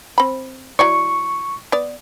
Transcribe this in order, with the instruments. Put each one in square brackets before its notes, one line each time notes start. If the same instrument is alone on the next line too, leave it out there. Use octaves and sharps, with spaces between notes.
[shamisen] C4 B5
[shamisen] F#3 E4 D5 [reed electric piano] C#6
[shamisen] B3 D5